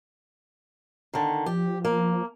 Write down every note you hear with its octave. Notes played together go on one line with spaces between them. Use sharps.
D3 D#3
F3 G4
A#3